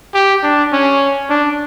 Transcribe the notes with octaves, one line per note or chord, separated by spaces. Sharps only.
G4
D4
C#4
D4